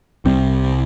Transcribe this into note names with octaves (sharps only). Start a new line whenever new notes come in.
C2 C3 G3 C4